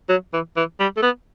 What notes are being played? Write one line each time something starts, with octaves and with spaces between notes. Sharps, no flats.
F#3
E3
E3
G3
A3
B3